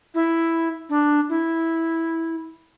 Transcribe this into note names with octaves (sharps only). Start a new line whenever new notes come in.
E4
D4
E4